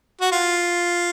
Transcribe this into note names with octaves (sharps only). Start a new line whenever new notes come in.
F#4
F4